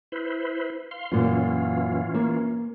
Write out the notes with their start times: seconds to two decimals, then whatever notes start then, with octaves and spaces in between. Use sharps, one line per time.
0.12 E4 B4 C5
0.91 F5 C6
1.12 F#2 A#2 E3 C#4 F4
2.14 A#3